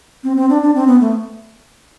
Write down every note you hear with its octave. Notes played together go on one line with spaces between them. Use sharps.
C4
C4
D4
D4
C4
B3
A3